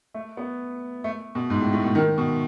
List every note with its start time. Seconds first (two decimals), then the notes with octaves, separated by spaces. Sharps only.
0.14 A3
0.37 B3
1.04 A3
1.35 B2
1.50 G#2
1.61 A2
1.73 A2
1.84 B2
1.95 D#3
2.18 B2